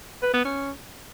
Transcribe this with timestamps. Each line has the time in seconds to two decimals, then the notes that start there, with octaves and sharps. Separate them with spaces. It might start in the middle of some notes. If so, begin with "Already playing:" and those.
0.22 B4
0.34 B3
0.45 C#4